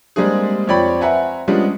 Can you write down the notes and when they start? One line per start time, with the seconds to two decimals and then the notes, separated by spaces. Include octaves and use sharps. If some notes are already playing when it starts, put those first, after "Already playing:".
0.16 G3 G#3 A#3 C4 D4 G#4
0.68 F2 C4 C#5 D5 G5 B5
1.01 C4 B4 E5 F#5 G#5 A#5
1.48 F3 G3 G#3 B3 C#4 D4